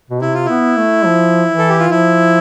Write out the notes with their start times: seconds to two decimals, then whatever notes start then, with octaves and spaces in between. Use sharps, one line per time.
0.10 B2
0.22 C3 E4
0.34 F4
0.45 B3 E4
0.78 A3
1.06 F3
1.48 E3
1.58 A4
1.68 G4
1.79 F4
1.90 F3 E4